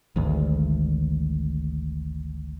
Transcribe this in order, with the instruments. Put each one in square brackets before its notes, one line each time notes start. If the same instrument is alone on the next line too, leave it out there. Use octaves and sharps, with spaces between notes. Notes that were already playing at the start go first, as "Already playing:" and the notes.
[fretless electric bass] G#1 D2